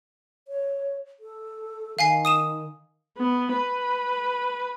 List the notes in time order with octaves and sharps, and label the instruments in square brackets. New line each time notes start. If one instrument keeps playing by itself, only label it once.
[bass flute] C#5
A4
[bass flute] D#3 [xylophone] F5 G#5 C7
[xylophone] D#6 D#7 E7
[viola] B3
B4